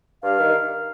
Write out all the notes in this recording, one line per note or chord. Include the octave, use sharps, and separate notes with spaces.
G2 F5
D#3